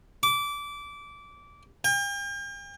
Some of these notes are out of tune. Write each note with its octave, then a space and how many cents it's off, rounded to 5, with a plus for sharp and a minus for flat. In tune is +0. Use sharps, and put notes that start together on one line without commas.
D6 -20
G5 +40